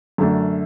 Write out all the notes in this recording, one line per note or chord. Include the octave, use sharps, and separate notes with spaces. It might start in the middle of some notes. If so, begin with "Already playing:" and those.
F#2 D3 A3 D4